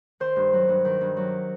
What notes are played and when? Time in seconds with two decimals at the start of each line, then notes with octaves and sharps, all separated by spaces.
0.20 D#3 C5
0.36 G2
0.53 F#3
0.69 G2
0.85 D#3
1.01 G2
1.17 F#3